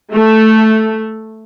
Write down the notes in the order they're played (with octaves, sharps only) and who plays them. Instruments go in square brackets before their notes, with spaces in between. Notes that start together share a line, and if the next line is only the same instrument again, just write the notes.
[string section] A3